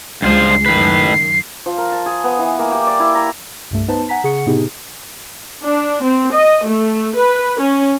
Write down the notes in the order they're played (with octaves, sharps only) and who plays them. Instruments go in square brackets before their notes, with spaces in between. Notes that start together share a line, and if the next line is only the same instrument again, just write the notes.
[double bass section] C#2 G#3 [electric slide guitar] G2 F4 C5 [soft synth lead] C7
[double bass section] F#2 D#3 [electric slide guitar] A2 B4
[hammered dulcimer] F3
A#4
A5
G#4
B3
E3
A#3
G4
D5
E4
A#5
[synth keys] C2 G2 A3
B3 D#4 B4 C5 A5
F#5 G#5 A#5 B6
C#3 G#4 F#5 C#6 C#7
A2 C3 B3 D#4 G4 G#4
[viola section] D4
C4
D#5
A3
B4
C#4